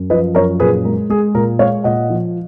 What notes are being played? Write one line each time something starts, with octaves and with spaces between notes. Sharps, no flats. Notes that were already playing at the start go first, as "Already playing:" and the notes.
Already playing: F#2
F3 B4 D#5
F#2 A#4 C#5
A#2 G#4 B4
G#3 A#4
G#3 G#4
A#2 A#4
G#3 C#5 F5
A#2 D#5 F#5
F3